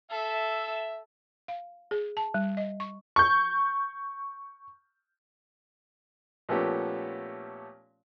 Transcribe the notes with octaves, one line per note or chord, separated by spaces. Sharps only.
A4 E5
F5
G#4
A5
G3
D#5
C#6
C#6 G6
A#2 F3 A3 B3 C#4 G4